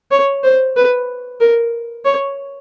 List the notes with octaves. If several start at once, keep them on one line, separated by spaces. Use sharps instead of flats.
C#5
C5
B4
A#4
C#5